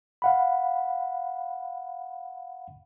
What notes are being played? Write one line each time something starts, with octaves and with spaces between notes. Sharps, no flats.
F5 F#5 B5